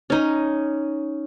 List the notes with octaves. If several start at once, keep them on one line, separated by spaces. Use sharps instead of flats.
C#4 D#4